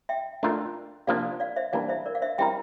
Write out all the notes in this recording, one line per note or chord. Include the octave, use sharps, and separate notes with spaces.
E5 G5
A3 D4 F4 A#4
C3 F3 A#3 D4 D5 F5
D5 F5
C5 E5
E3 G3 A#3 D4 D5 F5
C5 E5
A#4 D5
F5
C5 E5
G3 C4 E4 A#4 E5 G5